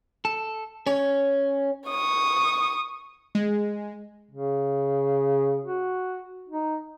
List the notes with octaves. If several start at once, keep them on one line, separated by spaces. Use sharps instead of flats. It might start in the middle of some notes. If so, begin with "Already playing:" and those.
A4
C#4 C#5
C#6 D#6
G#3
C#3
F#4
D#4